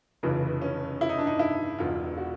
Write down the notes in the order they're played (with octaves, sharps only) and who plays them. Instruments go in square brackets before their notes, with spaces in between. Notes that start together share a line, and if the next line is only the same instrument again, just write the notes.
[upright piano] F1 F2 C#3 E3
C#4
E4
D#4
D4
D#4
E4
E1 E2 B2 F4
F#4